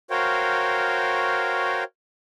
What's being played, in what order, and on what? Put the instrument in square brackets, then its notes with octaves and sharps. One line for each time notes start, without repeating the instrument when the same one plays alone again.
[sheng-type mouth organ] F#4 A#4 C5 C#5 F5 G5